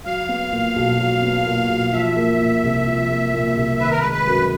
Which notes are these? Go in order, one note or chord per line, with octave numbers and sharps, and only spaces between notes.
F#3 F5
B3
A#2
B1
F#3
B3
A#2
B1
F3 E5
A#3
A#2
C2
F3
A#3
A#2
C2
D#3 B4
A#4
B4
G#3
B4
F#2